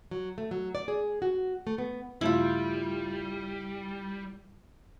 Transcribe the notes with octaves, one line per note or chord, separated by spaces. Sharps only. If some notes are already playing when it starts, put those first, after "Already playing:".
F#3
A3
F#3
D5
G#4
F#4
A3
B3
G2 C#3 G3 A3 E4 F4